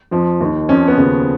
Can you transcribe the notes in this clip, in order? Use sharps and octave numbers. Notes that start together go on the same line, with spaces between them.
F2 F3
D#2 D#3
F2 F3 C#4
B3
D#2 C#3 F3